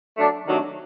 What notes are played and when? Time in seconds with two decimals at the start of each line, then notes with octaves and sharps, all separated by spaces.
0.17 F#3 A3 D4
0.46 C3 D#3 F#3 A3 D4